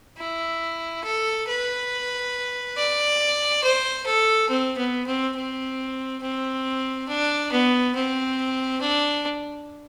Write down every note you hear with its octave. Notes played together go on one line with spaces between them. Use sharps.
E4
A4
B4
D5
C5
A4
C4
B3
C4
C4
C4
D4
B3
C4
D4